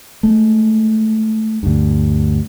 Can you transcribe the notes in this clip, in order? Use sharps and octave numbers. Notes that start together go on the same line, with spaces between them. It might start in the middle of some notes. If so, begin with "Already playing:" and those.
G#3 A3
D2 G2